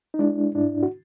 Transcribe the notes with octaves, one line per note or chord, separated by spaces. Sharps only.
D#4
G#3 D4 E4
G#2 D4 E4
F#4